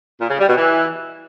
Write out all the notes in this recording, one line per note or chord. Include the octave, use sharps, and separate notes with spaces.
A#2
C#3
G3
B2
E3